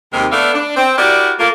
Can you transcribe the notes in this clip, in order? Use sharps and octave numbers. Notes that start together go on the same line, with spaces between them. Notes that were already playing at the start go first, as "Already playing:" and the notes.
D#2 C3 D#3 G#3 A#4
A3 B3 D4 A4 E5 F5
D4
C4
E4 F#4 G4 A#4 D5
A3 A#3 F4